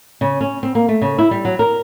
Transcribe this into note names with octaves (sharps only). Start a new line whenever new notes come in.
C#3
C#4
C4
A#3
A3
C#3
E4
G3
F#3
A#4